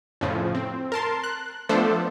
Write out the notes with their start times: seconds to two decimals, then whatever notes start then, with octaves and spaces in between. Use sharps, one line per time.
0.21 F2 A2 C#3 F3
0.55 C4
0.92 A#4 A5 C6
1.24 F#6
1.69 F3 A3 B3 D4 A4 C5